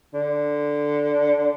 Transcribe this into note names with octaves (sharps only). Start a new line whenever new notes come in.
D3